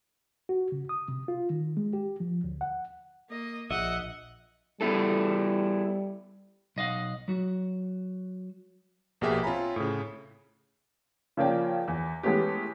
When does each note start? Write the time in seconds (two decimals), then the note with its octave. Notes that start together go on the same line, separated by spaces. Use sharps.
0.49 F#4
0.72 C#3
0.89 D#6
1.08 C3
1.28 F4
1.50 D#3
1.77 G#3
1.93 G4
2.20 F3
2.44 D2
2.61 F#5
3.30 A#3 D#5
3.71 A#1 D#5 E5 F#5
4.81 G3 B3 E4 A4
6.76 B1 D#5 F5 F#5
7.28 F#3 F#4
9.21 A#1 B2 A#3 G4 G#4 E5
9.44 C4 F4 C#5 G#5 A#5 B5
9.76 A2 C#3
11.37 C#3 F3 A#3 C#4 D5 G5
11.88 E2
12.23 E3 G#3 A3 B3 C#4 G4